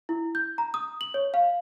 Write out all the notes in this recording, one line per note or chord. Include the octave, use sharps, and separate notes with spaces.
E4
G6
A#5
D#6
F#7
C#5
F5